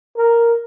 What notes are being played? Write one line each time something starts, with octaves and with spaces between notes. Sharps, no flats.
A#4